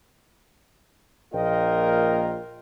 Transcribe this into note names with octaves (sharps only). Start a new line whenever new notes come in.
A#1 A#3 F4 A#4 D#5 G5